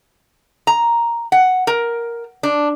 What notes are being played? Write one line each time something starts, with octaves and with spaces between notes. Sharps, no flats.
A#5
F#5
A#4
D4